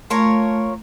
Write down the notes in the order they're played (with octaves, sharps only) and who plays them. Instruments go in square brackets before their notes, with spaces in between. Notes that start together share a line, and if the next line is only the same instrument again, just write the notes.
[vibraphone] A3 [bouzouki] F4 A#4 C#5